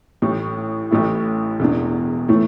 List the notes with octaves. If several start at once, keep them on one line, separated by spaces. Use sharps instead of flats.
A1 A2 A3
A1 A2 A3 E4
E1 E2 E3 D4
A2 E3 A3 E4